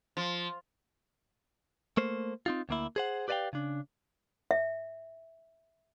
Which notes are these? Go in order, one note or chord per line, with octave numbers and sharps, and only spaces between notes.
F3
A3 A#3 C5
C4 D#4 F4
D2 A#3 E4
G#4 C5 F#5
G4 B4 D5 D#5 F5 G5
C#3 D4
E5